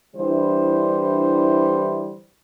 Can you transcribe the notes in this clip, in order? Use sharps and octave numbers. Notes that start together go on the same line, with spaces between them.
D3 E3 G3 D4 E4 C5